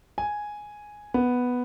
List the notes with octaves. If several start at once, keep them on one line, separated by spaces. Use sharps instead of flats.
G#5
B3